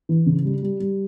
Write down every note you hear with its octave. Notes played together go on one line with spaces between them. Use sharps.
E3
C#3
G3
G3
G3